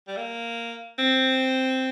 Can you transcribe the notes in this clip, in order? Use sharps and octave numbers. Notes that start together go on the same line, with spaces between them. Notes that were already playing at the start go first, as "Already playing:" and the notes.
G3
A#3
C4